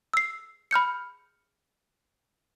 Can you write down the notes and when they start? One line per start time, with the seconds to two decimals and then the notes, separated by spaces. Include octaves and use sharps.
0.14 E6 C7
0.71 B5 F6 G6 C#7